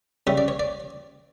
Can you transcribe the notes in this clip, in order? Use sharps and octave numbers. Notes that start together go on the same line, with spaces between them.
C#3 G3 C#4 E5
D5
C#5
D5